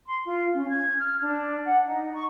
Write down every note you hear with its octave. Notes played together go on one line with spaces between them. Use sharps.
C6
F4
C#4
G#6
F6
D4
F#5
D#4
C#6